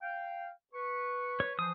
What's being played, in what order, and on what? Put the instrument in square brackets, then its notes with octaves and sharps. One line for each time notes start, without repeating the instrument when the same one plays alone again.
[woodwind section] F5 G5
B4 C#6
[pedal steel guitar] C#5
[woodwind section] E3 F3 C5 [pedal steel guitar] D#6